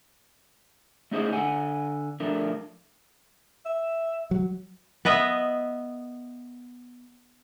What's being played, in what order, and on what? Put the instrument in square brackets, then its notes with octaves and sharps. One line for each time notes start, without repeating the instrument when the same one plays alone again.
[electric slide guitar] A3 C#4 D#4 E4 G#4 C5
D3 F#5 G#5
F3 A3 D4 A#4
[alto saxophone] E5
[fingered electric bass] F#3
[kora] B3 B4 D#5 E5